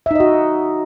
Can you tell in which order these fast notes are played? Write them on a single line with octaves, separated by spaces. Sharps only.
E5 D#4 D#5 F#4